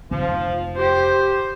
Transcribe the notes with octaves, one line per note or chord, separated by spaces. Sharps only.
F1 F3
G4 C5